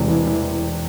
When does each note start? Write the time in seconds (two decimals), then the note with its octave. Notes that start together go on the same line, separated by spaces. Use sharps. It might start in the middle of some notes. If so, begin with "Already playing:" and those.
Already playing: E1 C3
0.08 E3
0.27 E3